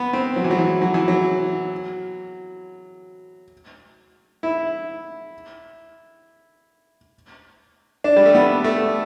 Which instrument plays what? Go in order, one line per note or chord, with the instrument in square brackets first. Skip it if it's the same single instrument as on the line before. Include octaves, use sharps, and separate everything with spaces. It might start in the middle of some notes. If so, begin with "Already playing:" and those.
Already playing: [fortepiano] B3
C4
F#3
E3
F#3
E3
F#3
E3
F#3
E4
D4
G3
A3
B3
A3